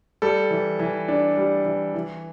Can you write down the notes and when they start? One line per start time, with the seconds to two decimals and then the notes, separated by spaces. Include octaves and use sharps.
0.22 G3 A4
0.50 E3
0.79 E3
1.08 D4
1.37 G3
1.65 E3
1.94 E3